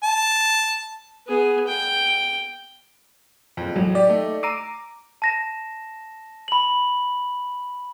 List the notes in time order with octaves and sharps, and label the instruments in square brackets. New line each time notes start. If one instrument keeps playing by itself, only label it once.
[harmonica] A5
[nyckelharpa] B3 G#4
G5
[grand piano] F#1 F2
[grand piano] A1 [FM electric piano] F#3
[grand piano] G4 [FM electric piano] D5
[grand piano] A3 D#4
[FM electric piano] A#5 D6 [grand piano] E6 C7 D#7
[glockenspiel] A5 A#6 E7
B5 F#7